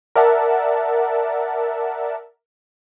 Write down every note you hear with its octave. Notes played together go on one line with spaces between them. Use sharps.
A#4 D5 E5 F#5 A5